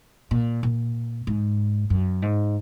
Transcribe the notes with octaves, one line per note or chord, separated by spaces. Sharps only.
A#2
A#2
G#2
F#2
G#2